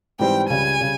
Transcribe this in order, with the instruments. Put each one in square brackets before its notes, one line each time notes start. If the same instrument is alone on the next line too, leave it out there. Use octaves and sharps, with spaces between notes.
[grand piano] G#2 E3 G3 C4 [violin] G5
[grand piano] C#2 C#3 G3 [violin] G#5
[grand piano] C#3 G3